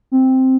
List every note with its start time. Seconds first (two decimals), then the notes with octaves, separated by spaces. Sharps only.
0.12 C4